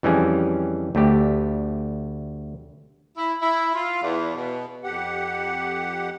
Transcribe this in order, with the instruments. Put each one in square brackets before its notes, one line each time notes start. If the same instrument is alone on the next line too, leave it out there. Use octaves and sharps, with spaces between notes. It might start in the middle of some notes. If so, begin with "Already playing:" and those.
[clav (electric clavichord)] F2 E3 G3 C#4 G#4
D2 A3 G4
[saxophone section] E4
E4
F4
E2
B2
[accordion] F2 G4 F#5